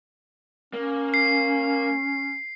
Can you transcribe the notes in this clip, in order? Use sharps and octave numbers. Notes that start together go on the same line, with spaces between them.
A#3 C#4
C7